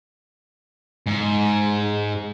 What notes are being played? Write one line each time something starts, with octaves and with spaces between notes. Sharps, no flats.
G#2